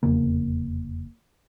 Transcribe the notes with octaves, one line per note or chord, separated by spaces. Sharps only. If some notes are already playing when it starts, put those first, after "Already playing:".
F1 E2 C#3 A#3